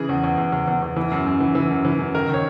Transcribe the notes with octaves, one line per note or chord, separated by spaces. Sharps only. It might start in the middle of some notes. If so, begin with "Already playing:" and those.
Already playing: C#3 E3 G#4
E2
E2
E2
E2
E2
E2
E3
F#2
F#2
E3
E3
F#2
E3
F#2
D#3 A#4
D#3
C#5